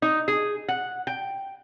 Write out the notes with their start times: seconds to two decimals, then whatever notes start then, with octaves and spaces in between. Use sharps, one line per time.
0.02 D#4
0.28 G#4
0.68 F#5
1.07 G5